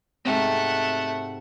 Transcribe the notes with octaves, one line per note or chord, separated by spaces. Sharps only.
G#2 C3 A3 C4 F#5